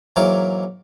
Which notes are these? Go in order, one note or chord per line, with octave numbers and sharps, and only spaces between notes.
G#2 E3 F#3 A#3 A#4 D6